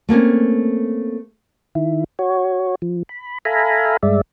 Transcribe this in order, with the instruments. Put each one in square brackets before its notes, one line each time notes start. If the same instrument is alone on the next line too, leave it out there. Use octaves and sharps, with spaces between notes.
[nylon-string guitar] A3 A#3 C4 C#4
[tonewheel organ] D#3 E4
F#4 C#5
F3
B5
A4 E5 F5 G#5 A#5 B5
G2 G#3 D5 E5